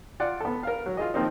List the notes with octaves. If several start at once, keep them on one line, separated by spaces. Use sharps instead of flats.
F4 D5 F#5
B3 A4
A#4 F5
F#3
F4 G#4 D#5
D#3 F3 A#3 C4 D#4